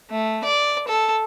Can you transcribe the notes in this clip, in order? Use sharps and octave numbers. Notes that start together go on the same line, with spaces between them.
A3
D5
A4